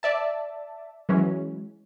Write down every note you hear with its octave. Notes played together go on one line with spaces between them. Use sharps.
D5 E5 A5
E3 F#3 G#3 C#4